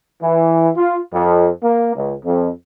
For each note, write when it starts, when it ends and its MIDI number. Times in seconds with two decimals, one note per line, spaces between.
0.22 0.69 52
0.77 0.99 65
1.13 1.49 41
1.63 1.94 58
1.96 2.15 37
2.25 2.50 41